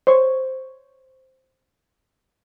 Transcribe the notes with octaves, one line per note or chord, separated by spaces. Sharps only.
C5 C#5 C#6